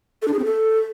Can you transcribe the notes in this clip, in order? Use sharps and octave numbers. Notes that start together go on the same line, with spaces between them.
A4
D4
G#4
C4
A4